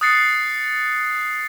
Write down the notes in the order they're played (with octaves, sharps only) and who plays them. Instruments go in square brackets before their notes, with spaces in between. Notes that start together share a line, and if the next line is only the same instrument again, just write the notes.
[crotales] D#6 F#6 A6 C7 C#7